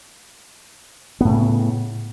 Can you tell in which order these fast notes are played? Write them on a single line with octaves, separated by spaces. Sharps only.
B3 A2 C#3